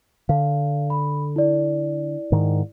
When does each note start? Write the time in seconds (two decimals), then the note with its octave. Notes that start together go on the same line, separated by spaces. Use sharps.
0.29 D3 F5
0.90 B5
1.36 E4 D5
2.32 G#2 D#3